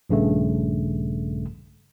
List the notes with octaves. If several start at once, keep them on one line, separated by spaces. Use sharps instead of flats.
A#1 G2 C#3 A3